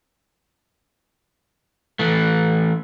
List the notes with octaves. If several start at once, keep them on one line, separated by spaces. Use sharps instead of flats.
E3 A3